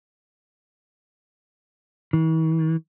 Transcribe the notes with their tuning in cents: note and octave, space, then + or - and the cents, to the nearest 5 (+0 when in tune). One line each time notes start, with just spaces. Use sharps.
E3 -45